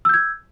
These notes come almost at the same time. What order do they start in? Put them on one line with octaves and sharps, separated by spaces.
E6 G6 G#6